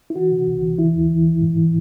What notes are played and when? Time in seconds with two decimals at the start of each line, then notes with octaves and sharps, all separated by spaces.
0.10 E4
0.16 E3 F#4
0.32 C3
0.48 C2
0.62 E3
0.78 E3 E4
0.95 D#2
1.10 E3
1.26 E3
1.42 G#2
1.57 E3